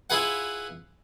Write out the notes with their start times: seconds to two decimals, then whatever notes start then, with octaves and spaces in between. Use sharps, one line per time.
0.10 E4 F4 G#4 B4 F#5